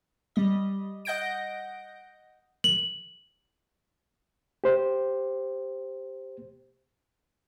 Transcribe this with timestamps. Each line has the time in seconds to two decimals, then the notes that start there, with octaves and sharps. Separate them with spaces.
0.36 G3 D#5
1.05 D#5 F#5 G6 A#6 D7
2.64 F#7
4.64 G4 C5